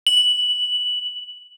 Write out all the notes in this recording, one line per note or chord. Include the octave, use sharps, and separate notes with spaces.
F#7